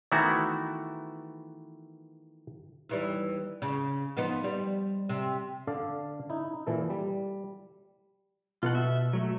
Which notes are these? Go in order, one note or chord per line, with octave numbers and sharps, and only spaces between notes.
D#3 E3 A3 B3 E4 F#4
D#2 E3 G3
C#3
F3 B3 D#4
G3
C3
D3 A4 D5 F5
D#4 E4
A#2 E3 A4
G3
B2 F4 A4 F#5
E5
F#3 A3